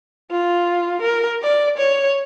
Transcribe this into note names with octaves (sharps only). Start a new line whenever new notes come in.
F4
A#4
D5
C#5